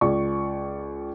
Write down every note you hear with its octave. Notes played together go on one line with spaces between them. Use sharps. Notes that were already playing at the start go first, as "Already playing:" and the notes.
C#2 D5 C#6